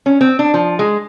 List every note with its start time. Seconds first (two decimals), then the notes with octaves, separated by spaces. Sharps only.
0.06 C#4
0.21 C4
0.39 D4
0.54 F3
0.79 G#3